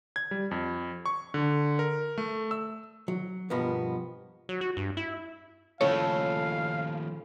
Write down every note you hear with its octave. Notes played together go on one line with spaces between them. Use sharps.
G#6
G3
F2
C#6
D3
A#4
A3
E6
F#3
G2 B2 F3 A#3 B3
F#3
F#4
G2
E4
D#2 A2 C#3 F3 A4 C#5 F5